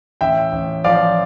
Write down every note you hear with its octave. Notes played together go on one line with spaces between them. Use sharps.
A1 E5 G5
A1
F3 D5 F5